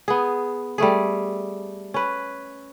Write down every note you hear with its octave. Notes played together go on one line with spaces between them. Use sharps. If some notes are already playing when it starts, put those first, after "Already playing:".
B3 G#4
G3 A3 G#4
C#4 B4